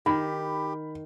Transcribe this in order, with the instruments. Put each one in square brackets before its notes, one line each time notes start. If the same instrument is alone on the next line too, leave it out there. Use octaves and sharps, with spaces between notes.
[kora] D#3 [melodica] G4 [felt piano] B5